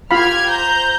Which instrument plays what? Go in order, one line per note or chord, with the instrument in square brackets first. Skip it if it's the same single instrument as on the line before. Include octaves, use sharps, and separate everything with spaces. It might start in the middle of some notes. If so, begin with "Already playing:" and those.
[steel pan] F4 F5 B5 [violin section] G4 F6 G#6
[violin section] C5 A#5 G6